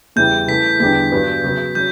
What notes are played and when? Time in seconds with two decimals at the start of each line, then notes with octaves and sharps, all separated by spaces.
0.16 E2 C#3 E3 G3 G6
0.48 C#3 E3 A3 E4 B6
0.80 E2 D3 G3 B3 D4 B6
1.12 G2 F#3 B3
1.44 C#3 F#3 B3
1.75 F#3 C#4 G6